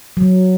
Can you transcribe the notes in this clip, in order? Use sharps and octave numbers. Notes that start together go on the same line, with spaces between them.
F#3